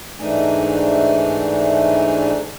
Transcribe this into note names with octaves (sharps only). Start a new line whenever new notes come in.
G#2 E3 A3 D4 D#4 G#5